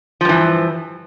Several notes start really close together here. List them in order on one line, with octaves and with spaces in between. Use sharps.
F3 G2 E3